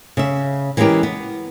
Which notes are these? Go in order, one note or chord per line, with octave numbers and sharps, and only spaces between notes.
C#3 E5
E3 G#3 B3 C#4 G4 A#4
B3